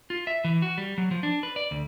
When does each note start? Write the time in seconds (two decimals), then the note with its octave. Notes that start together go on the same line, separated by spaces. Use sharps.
0.10 F4
0.27 E5
0.44 E3
0.62 F#4
0.78 G3
0.98 F#3
1.11 F3
1.23 D4
1.43 B4
1.56 D5
1.71 D2